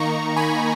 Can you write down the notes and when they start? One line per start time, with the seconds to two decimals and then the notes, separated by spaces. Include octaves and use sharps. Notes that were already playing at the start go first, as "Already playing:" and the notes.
Already playing: D#3 A#3 D#4 A#5 C#6
0.36 G#5 B5